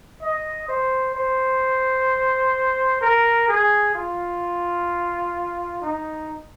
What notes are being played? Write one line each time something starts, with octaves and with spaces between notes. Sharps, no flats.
D#5
C5
C5
A#4
G#4
F4
D#4